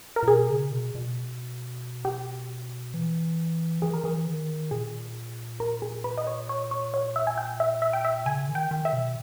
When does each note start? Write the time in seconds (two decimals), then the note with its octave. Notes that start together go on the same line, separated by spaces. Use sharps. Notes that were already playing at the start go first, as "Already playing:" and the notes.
0.16 A#4
0.23 A#2
0.27 B2 G#4
0.50 C#3
0.71 B2
0.95 B2
2.05 G4
2.94 E3
3.82 E3 G#4
3.94 A#4
4.04 E3 G#4
4.27 D#3
4.71 A#2 G#4
5.60 A#4
5.82 G#4
6.04 B4
6.17 D#5
6.27 C#5
6.49 C#5
6.71 C#5
6.94 C#5
7.16 E5
7.27 G#5
7.38 G5
7.60 E5
7.82 E5
7.93 G5
8.05 E5
8.26 C#3 G#5
8.49 D#3
8.55 G5
8.71 D#3
8.85 E5
8.93 B2